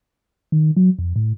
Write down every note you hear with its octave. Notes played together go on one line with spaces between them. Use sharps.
D#3
F#3
F2
A2